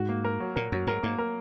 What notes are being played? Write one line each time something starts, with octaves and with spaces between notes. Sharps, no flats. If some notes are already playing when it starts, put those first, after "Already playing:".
Already playing: G#2 F#4
A#3
A#4
F#3
A#2 A#4
F#2 F#3
G#2 A#4
G#2 A#3
A#4